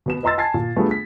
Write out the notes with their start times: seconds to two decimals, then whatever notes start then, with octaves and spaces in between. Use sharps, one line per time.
0.06 B2 B3 E7
0.23 B4 D#5 A#5 C6 E6 A6
0.38 G#5 A5 G#6 A6 C7
0.54 A#2
0.76 G3 A3 B3 D4 F4 G#4
0.91 B6